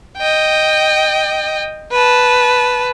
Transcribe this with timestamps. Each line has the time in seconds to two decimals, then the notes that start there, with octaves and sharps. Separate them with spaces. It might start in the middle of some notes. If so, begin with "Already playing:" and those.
0.17 D#5 G5
1.92 B4 A5